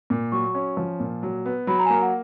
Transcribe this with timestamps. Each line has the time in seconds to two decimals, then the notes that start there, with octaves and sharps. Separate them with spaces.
0.10 A#2
0.32 F#3 C#6
0.55 C#4
0.77 F3
1.00 A#2
1.23 F#3
1.46 B3
1.67 F#3 B5
1.79 A#5
1.85 G#5
1.90 A#3 A#5
2.01 F#5